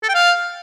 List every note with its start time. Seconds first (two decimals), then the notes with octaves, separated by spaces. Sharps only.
0.03 A4
0.09 G5
0.14 F5